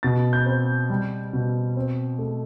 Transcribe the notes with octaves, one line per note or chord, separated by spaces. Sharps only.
B2 A6
G6
C4
G3
B2
C4
A3